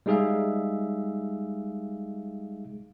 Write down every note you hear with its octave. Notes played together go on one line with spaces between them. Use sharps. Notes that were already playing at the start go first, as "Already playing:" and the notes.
G3 G#3 D#4 G#4 E5 F5